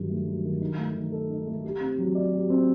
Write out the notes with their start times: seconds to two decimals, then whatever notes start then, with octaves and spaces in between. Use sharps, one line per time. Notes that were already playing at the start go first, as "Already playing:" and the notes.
Already playing: G2 D#3 F#3
0.09 A3
0.26 F#3
0.43 D#3
0.61 D#4
0.78 A3
0.95 D#3
1.12 A4
1.30 D#4
1.46 A3
1.64 G4
1.81 C4
1.98 F#3
2.15 D5
2.32 G4
2.50 C4